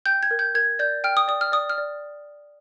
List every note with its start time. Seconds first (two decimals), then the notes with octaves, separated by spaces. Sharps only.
0.06 G5 G6
0.23 G#6
0.31 A#4
0.39 G6
0.55 A#4 G#6
0.79 D5 G6
1.04 G5 F6
1.17 D#6
1.28 D5 D#6
1.41 F6
1.52 D5 D#6
1.70 F6
1.78 D5